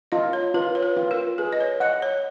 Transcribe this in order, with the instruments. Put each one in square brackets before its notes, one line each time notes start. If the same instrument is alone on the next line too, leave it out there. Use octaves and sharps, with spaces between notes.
[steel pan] F4 [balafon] D#5
[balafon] C#5
[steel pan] F4 [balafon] B4
[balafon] C#5
B4
[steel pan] F4
[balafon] A#4
[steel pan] G#4 [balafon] B4
[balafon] D#5
C#5
[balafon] D#5 [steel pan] F#5
[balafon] C#5